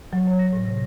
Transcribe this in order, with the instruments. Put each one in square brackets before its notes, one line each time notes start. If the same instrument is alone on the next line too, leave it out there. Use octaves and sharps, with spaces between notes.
[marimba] F#3
C#5
A#6
A2
C3